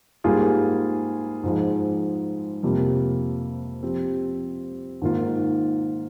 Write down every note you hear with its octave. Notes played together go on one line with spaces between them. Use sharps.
G#2 G3 A#3 F4 G#4
G#2 F3 G#3
F2 C3 G3 A#3 F4
F3 C4 G4 C5
G#2 D#3 A#3 F4